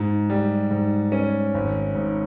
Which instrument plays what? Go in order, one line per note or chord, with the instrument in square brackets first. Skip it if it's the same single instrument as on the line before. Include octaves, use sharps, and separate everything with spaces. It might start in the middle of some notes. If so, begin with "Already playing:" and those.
Already playing: [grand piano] G#2
G3
G#2
C#4
G#1
G#2